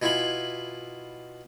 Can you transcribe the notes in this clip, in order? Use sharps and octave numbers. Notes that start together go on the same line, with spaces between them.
B2 E4 F4 G#5 B5